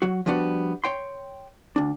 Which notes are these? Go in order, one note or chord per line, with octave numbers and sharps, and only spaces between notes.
F#3 F#4
F3 G3 B3 D4 F#4
C#5 G5 C6
D2 D4